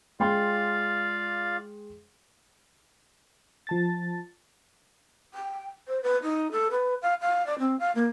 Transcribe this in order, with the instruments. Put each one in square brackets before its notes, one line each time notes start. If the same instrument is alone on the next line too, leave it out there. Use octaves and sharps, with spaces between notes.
[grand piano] G#3 G5 C6 [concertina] F4 D5 F5
[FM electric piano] F3 A5 A6
[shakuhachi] G5
C5
B4
D#4
A4
B4
F5
F5
D5
C4
F5
A#3